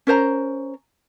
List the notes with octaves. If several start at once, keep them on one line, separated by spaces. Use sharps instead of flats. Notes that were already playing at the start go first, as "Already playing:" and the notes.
C#4 A#4 C5 A#5